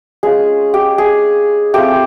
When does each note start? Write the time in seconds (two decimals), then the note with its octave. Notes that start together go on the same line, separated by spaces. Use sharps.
0.23 G#3 C#4 F4 G#4
0.74 G4
0.98 G#4
1.74 A3 C4 F4 G4